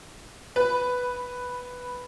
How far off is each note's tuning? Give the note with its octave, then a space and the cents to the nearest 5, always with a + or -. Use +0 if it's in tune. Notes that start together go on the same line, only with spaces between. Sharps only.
B4 +0 B5 +0